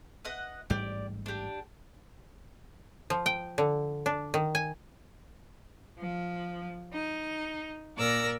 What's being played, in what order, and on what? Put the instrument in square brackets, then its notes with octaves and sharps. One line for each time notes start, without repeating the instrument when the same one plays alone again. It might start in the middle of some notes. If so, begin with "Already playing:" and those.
[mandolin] B4 D#5 F#5
[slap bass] A1 G#2 G3 [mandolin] G4 D5
[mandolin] D4 G4
[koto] F3
G5
D3
D4
D#3
G#5
[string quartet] F3
D#4
A#2 A#4 D5 E6 A#6